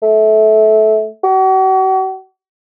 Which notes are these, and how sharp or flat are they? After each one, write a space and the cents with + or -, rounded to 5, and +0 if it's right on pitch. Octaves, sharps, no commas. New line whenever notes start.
A3 -20
F#4 +40